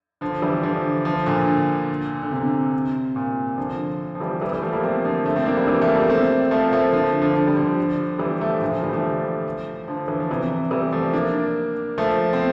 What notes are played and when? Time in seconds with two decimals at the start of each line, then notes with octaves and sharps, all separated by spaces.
0.21 D3 F3
0.42 E3 G3
0.63 D3 F3
1.05 D3 F3
1.26 A#2 D3
2.22 D3
2.31 C3
3.16 A#2
3.58 D3 F3
4.15 F3
4.20 E3 G3
4.41 E3 G3
4.52 E3 G3
4.62 F3 A3
4.73 G3 A#3
4.83 A3 C4
5.05 D3 F3
5.26 F3 A3
5.36 A3 C4
5.46 A#3 D4
5.57 G3 A#3
5.68 E3 G3
5.81 F3 A3
5.95 G3 A#3
6.10 A3 C4
6.51 F3 A3
6.64 A#3
6.72 F3 A3
6.93 D3 F3
7.21 D3 F3
7.35 D3 F3
7.47 G3
7.57 D3 F3
8.19 E3 G3
8.41 F3 A3
8.61 A#2 D3
8.72 D3 F3
8.83 E3 G3
8.93 F3 A3
9.88 D3 F3
10.08 E3
10.20 F3
10.31 C3 E3
10.71 E3 G3
10.92 F3 A3
11.13 A#3 D4
11.98 F3 A3
12.33 C4